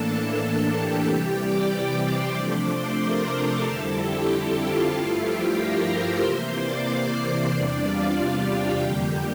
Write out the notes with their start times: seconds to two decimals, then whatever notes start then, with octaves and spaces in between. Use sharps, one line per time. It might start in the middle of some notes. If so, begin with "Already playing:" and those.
Already playing: A2 E3 A#3 D4 A4 A5
0.41 A4 A5
0.73 G4 G5
1.05 C3 E3 G3
1.37 D5 D6
2.03 C5 C6
2.35 C3 F3 A3 D4 D5 D6
2.67 C5 C6
2.99 A#4 A#5
3.31 A4 A5
3.64 F2 D3 G3 C4 E4
3.96 G4 G5
4.28 G4 G5
4.61 F4 F5
4.93 G2 F3 A3 E4
5.25 G4 G5
5.57 A#4 A#5
5.89 C5 C6
6.22 C3 E3 A#3
6.54 D5 D6
6.86 D5 D6
7.18 C5 C6
7.50 E2 C3 G3 D4 D5
7.83 F4 F5
8.15 F4 F5
8.47 G4 G5
8.80 F2 D3 G3 A#3